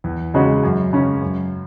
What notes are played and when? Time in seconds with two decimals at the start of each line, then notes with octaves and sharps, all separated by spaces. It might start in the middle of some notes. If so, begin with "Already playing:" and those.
0.04 E2
0.34 C#3 G#3 D#4 F#4
0.63 F#2
0.93 C#3 G#3 C#4
1.22 F#2